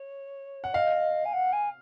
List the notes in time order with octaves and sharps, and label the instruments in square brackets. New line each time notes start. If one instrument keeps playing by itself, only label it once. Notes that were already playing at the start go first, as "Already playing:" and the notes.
Already playing: [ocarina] C#5
[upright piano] F#5
[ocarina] D#5 [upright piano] F5
[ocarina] G#5
F#5
G#5